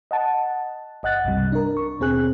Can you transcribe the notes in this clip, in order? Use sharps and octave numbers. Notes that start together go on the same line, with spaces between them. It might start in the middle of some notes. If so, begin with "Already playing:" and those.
D#5 F#5 A5
G1 D#5 F#5 F#6 A6
C2 G2 C3 G3
D4 A#4
C#6
D#2 B2 C4 G#4 F#6